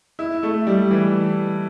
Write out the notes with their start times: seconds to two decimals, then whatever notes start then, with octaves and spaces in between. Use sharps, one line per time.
0.19 E4
0.43 A3
0.67 G3
0.91 E3